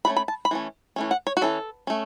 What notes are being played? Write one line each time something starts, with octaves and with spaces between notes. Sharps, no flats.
F#3 A3 C#4 B5
B5
A5
B5
E3 A3 C#4
E3 A3 C#4
F#5
C#5
F#4
E3 C#4 A4
A3 C#4